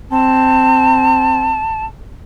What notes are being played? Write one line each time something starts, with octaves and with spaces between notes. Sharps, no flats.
C4 A5